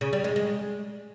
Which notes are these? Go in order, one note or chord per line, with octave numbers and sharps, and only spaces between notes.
C#3
G3
G#3
G#3